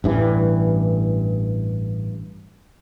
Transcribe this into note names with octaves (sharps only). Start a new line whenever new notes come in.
A1 G2 E3